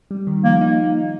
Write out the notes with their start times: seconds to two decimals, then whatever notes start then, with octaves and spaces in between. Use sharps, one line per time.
0.11 G3
0.27 D#3
0.44 F3 A#3
0.61 D#4